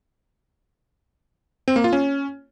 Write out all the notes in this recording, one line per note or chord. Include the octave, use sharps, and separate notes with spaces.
C4
A#3
F4
C#4